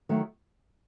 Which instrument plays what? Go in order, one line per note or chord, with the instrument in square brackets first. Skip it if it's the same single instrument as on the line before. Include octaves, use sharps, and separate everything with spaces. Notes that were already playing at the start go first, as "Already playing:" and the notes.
[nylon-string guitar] D#3 F#3 A3